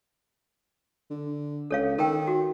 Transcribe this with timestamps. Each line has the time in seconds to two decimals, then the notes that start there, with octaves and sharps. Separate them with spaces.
1.10 D3
1.71 C#2 A4 C#5 F5
1.98 D#3 A4 A#4 G5
2.27 F#4